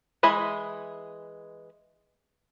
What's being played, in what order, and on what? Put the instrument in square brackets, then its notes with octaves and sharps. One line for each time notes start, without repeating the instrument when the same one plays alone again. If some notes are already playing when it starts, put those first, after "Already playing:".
[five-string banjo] E3 G#3 E4 G#5 B5